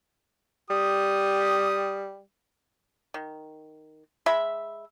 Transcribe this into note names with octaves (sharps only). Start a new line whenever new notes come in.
G3 G4 D#6
D#3
G#3 E5 B5